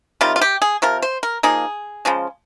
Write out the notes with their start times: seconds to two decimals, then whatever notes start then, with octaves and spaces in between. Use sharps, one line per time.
0.21 C3 D#3 G3 F4
0.36 F4
0.41 G4
0.62 G#4
0.82 C3 F3 A#4
1.02 C5
1.23 A#4
1.43 F3 A#3 D#4 G#4
2.05 C#3 F3 G#3